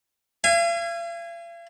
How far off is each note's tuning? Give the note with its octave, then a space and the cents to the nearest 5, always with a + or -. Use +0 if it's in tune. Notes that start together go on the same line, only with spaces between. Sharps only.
F5 -45 G#5 -20